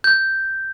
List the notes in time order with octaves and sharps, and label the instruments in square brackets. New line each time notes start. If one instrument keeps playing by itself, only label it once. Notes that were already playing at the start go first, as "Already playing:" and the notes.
[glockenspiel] G6